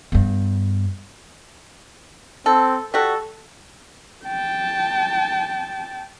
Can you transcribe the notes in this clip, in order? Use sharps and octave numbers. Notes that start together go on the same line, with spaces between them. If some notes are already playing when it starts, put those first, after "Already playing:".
G2 B3
C4 A4
G3 F#4 A4
G5 A5